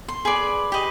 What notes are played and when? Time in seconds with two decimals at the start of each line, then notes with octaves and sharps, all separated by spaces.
0.08 C6
0.25 G#4 B4 D5
0.72 G4 B4 D#5